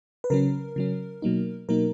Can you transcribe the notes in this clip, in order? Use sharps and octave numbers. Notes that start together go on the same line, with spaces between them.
B4
C#3 F#3 C#4 A#4
C#3 F#3 C#4
B2 F#3 A#3 D#4
B2 F#3 A#3 D#4 A#4